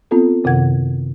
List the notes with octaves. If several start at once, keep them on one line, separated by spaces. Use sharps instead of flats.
B3 C4 F4 A4
F#2 C3 D#3 F#5 G#6